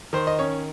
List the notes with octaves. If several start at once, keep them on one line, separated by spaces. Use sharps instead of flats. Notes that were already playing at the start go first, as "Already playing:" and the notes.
D#3 C5
D#5
C#4 C#5